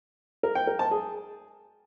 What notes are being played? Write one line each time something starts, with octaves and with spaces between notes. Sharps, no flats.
A#4
G5
A#4
A5
G#4